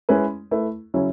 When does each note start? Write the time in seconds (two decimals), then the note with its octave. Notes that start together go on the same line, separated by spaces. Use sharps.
0.09 G#3 C#4 E4 B4
0.51 A3 E4 B4
0.94 C#3 F#3 C#4 E4